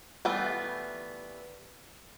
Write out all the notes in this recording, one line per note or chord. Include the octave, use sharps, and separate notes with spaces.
E3 G3 A3 B3 F4